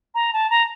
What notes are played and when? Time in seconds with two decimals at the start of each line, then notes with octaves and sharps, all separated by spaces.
0.15 A#5
0.33 A5
0.50 A#5